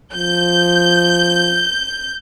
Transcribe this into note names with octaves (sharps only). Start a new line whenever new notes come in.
F3 G6